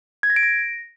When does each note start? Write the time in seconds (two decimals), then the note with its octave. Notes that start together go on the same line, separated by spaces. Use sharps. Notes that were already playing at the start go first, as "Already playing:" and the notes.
0.23 G#6
0.30 A#6
0.36 D7
0.43 A#6